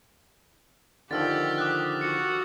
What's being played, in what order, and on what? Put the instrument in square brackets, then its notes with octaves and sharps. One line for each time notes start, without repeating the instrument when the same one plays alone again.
[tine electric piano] D3 D#3 F3 [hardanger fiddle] G4 [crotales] E6 F6 A6
[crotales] D6 D#6 F#6
[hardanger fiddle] F#4 [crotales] C#7